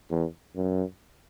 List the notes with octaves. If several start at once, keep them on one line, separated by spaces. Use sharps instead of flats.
E2
F#2